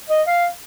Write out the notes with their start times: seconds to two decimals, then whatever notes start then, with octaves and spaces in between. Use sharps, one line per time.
0.10 D#5
0.27 F5